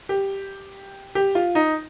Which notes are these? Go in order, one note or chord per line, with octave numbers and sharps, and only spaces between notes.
G4
G4
F4
D#4